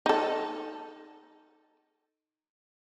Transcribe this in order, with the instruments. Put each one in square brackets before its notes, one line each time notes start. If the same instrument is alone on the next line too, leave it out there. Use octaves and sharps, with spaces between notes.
[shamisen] D#4 A4